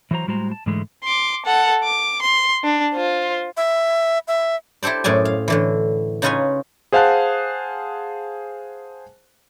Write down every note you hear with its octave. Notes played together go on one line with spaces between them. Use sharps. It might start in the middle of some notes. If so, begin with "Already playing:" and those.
E3 F#3 F#4 C5 A#5
A2 G3 G#3 F#4 C5 A#5
A5
G#2 D3 E3 G#3 A3
C6 D6
A4 F#5
D6
C6
D4
F4 C5
E5
E5
E4 G4 A4 C5 D5
F#2 A2 G#4 D5 G#5
F5
A2 D3 E3
C#3 D#4 F4 B4 C#5 G#5
G#4 C5 F5 F#5 A5 F#6